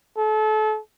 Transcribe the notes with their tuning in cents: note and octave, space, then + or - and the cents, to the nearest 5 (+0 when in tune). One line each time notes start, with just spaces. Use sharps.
A4 -30